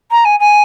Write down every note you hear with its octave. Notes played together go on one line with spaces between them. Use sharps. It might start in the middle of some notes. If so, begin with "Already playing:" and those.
A#5
G#5
G#5